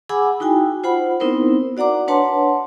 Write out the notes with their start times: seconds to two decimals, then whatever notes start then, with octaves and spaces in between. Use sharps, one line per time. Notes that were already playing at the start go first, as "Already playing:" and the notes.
0.09 G#4 F#5 G#5 B5 D6 E6
0.40 D#4 E4 F#4 G5 G#5
0.84 F4 C5 F#5 B5
1.20 B3 C4 D#4 E4 A#4 C5
1.77 F#4 D5 F#5 A#5 D6
2.08 D4 B4 C#5 F#5 A5 C6